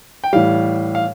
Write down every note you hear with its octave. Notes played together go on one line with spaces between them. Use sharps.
G5
A2 E3 G3 F5
F5